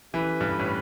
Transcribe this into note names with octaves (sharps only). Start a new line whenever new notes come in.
E3 A3 C#4 G4 B4
G2
A2